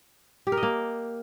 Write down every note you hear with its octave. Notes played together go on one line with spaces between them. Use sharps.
G4
A#4
D#5
A#3